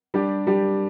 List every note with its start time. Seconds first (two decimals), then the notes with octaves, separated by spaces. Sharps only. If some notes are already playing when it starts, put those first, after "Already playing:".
0.14 G3 D4 G4
0.47 G3 D4 G4